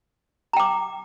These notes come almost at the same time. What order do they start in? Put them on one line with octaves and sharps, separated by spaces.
A#5 G5 D6